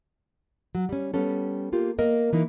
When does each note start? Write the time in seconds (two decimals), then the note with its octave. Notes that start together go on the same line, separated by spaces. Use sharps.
0.75 F#3
0.89 G3 C#4
1.14 G3 B3 C#4 A4
1.72 A#3 F4 G4
1.99 A#3 A#4 D#5
2.33 E3 A#3 D#4